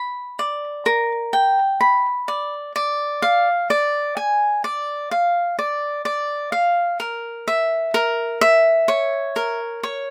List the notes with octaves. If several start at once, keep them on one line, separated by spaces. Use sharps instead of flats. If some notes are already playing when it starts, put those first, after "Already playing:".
Already playing: B5
D5
A#4
G5
B5
D5
D5
F5
D5
G#5
D5
F5
D5
D5
F5
A#4
E5
A#4
E5
C#5
A#4
C#5